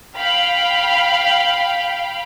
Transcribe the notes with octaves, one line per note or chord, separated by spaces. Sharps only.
F5 G5 B5